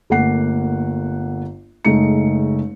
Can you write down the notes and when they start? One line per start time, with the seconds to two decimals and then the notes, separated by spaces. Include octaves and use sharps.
0.10 G1 A3 A#3 F#5 C7
1.85 F#1 G#3 A3 D#4 C#7